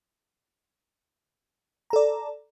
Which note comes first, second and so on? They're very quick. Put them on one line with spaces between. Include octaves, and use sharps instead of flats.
A#5 A4 D5